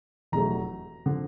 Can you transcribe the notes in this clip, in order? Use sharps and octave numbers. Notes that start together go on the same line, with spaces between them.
F1 E2 B2 F#3 A3 A#5
D3 F3